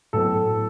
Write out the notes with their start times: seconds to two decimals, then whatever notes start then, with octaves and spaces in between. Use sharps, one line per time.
0.13 A2 F#3 B3 A4